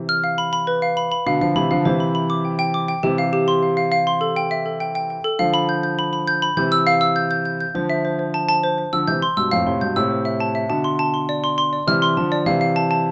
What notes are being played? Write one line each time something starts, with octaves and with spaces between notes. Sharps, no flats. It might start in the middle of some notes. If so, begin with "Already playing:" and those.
Already playing: C3 E3
F6
F5
B5
B5
B4
F5
B5
B5
B2 D3 F5
D3 F3 F5
C3 E3 B5
D3 F3 F5
C3 E3 C5
B5
B5
D6
G5
G5
D6
G5
C3 E3 G4
F5
G4
C6
F5
F5
F5
C6
A4
G5
E5
A4
G5
G5
G5
A4
D3 F3 F5
B5
G6
G6
B5
B5
G6
B5
C3 E3 G6
E6
F5
E6
G6
G6
G6
G6
D3 F3 C5
E5
C5
C5
A5
A5
C5
C5
D3 F3 E6
C3 E3 G6
C6
G2 B2 E6
F2 A2 F5
A2 C3 C6
G2 B2 G6
A2 C3 E6
C5
E5
A5
E5
B2 D3 A5
C6
A5
C6
D5
C6
C6
D5
C3 E3 F6
C6
D3 F3 A5
D5
C3 E3 F5
F5
A5
A5